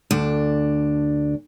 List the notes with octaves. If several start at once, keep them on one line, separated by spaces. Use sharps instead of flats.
D2 D4